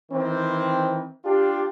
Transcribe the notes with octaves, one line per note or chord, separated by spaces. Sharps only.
D#3 E3 C4
D4 F4 G4